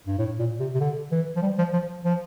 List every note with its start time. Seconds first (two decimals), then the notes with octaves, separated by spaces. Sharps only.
0.07 G2
0.18 A2
0.39 A#2
0.60 C3
0.75 C3
0.80 D3
1.12 E3
1.36 F3
1.42 G3
1.58 F3
1.73 F3
2.04 F3